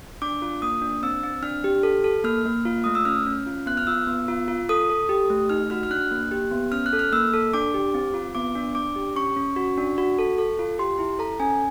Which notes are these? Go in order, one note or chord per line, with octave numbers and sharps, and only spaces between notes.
D4 D6
F4
A#3 D#6
D4
C4 E6
C4
D4 F6
G4
A4
A4
A#3 F6
A#3
F4
A3 D#6
E6
C#4 F6
C#4
F4
B3 F#6
F6
F4 E6
B3
F4
F4
A4 D#6
A4
G4
A3
D#4 F6
F#4 F6
F6
D4 F#6
A#3
G4
B3
C#4 F6
F#6
A4
F6
A#3 E6
A4
D4 D6
G4
C4
F4
B3 D6
D4
D4 D6
G4
C#4 C#6
C#4
F#4
D4
F#4
A4
A4
F4
G4 C6
E4
A4 A#5
C#4 G#5